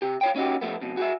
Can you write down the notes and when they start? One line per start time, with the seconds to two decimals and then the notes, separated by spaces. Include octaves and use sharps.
0.02 C3 G4
0.21 F4 C#5 G5
0.36 C#4 D#4 F#4 G4
0.61 F3 G#3 A3 B3
0.81 F2 B2
0.97 F#4 G#4 E5